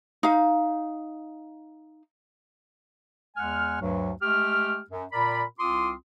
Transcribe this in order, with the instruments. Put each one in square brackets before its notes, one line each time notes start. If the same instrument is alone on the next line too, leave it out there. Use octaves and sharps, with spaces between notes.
[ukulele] D#4 F5
[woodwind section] E2 G#3 F#5 G#5 F6
D2 G2 F#3
G#3 A3 G4 F6
F#2
A#2 A#4 D5 B5
C2 C4 F4 C6 D6 D#6